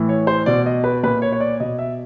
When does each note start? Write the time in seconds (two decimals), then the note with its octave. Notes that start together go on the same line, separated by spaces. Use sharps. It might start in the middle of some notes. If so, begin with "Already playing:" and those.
Already playing: A2 E3
0.09 C#5
0.27 C5
0.46 B2 D5
0.66 D#5
0.84 B4
1.03 A#2 B4
1.22 C#5
1.32 C#5
1.40 D5
1.60 B2 D#5
1.79 E5